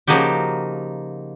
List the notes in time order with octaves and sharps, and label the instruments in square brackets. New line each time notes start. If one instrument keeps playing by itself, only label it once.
[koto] C#3 F3 A#3 D#4 F#4 G4